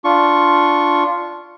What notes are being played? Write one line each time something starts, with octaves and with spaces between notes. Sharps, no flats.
D4 F4 C#6